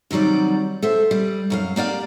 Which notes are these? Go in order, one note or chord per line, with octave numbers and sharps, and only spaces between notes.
C3 D#3 F#3 G3 D5
A4 C5 E5
G3
F#2 A#4 F5
A#3 G4 D5 F5